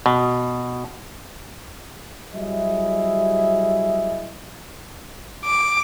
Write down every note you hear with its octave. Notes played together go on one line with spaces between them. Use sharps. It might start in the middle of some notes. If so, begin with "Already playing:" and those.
B2
F#3 G3 E4 G#4 D#5 E5
D6